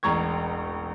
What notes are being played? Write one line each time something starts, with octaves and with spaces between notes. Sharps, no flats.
E1 A1 A#5 C#6 G#6